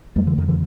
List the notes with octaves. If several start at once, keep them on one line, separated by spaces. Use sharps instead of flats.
F2 G3 A3
D3 E3
F2 D#3
D3 E3